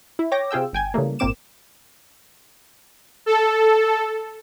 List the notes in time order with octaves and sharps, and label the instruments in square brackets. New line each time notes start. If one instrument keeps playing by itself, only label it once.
[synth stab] E4
C#5 G5 D6 A#6
C3 F4 G#4 G5 E6
G1 G5 G#5 G#6
C#3 E3 G3 A3 A#3
G#1 A#2 A#3 C4 D6 E7
[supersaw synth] A4